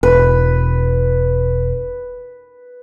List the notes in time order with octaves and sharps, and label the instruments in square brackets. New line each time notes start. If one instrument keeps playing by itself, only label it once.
[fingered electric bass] E1 [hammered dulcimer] B4